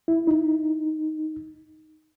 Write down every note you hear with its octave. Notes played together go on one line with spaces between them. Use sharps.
E4
D#4